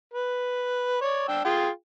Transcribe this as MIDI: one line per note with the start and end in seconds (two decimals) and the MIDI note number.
0.14 0.98 71
1.01 1.26 73
1.01 1.26 74
1.28 1.43 62
1.28 1.43 79
1.28 1.43 88
1.45 1.69 65
1.45 1.69 68
1.45 1.69 79